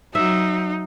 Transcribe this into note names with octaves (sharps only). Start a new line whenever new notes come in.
F#3 D#4 E5